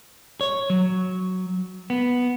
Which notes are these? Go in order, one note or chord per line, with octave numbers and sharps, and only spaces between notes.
C#5
F#3
B3